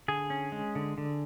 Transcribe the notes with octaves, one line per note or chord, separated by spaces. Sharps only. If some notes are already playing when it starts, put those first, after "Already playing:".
D3 G#4
C#4
G#3
D3
D3